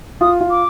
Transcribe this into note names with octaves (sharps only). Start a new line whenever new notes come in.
F4 D#6
F4
D6